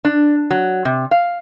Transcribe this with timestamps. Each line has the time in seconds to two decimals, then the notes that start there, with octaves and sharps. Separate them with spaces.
0.05 D4
0.51 F#3
0.85 C3
1.11 F5